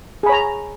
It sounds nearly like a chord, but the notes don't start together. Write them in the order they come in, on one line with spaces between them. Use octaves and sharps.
G#4 B5 C#5 A#5